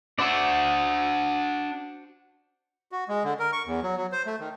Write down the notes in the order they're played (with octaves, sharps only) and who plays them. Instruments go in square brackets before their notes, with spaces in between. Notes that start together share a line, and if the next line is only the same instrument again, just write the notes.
[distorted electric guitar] D4 E5 [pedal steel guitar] F#4 C5 D5
[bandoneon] F#4
G#3
D3
A#4
C#6
E2
F#3
F#3
C5
A3
D#3